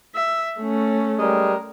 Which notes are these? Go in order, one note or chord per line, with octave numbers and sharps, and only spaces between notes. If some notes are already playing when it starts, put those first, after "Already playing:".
E5
A3 C#4
G3 G#3 A#4